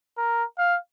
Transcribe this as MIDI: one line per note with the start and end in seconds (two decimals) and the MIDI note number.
0.17 0.44 70
0.58 0.78 77